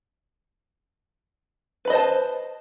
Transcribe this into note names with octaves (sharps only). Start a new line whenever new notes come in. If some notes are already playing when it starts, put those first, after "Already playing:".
B4 C5 D#5 A5 B5